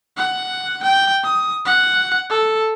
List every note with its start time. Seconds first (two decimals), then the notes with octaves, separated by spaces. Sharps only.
0.17 F#5
0.83 G5
1.24 D#6
1.66 F#5
2.30 A4